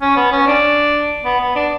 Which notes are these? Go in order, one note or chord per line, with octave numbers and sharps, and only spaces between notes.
C#4
B3
C#4
D4
B3
B3
D4